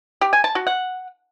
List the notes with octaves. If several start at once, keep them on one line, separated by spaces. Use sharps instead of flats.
G4
G#5
A5
F#4
F#5